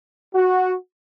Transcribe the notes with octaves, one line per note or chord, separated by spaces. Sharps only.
F#4